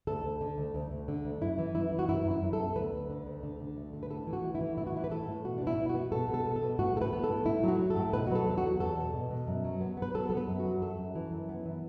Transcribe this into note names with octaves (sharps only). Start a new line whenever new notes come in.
D2 A4
D2
D3
D2
D2
D2
D3
D2
F#2 E4
E3
F#2 E4
E3
F#4
F#2 E4
F#2
E4
F#2
A4
B3
D2 B4
D2
D3
D2
D3
D3
D2
D3
B4
A2 A4
E3
F#4
A3
E4
E3
A2 E4
F#4
E3 E4
B4
A2 A4
A2
B2 F#4
B2 D4
E4
B2
F#4
B3
B2 A4
B2
A4
B3
A4
B2
A2 F#4
A2 A4
B4
B3
A4
A2
A2 E4
F#3 F#4
F#3
A4
A2
B2 B4
F#3 F#4
A4
E2
F#4
E2
E2 A4
B2
B2
B2
F#2
F#3
B3
B3
B4
F#3 A4
B3 A4
B4
F#2
F#4
F#3
F#2 A4
F#2
E3
F#2
B3
E3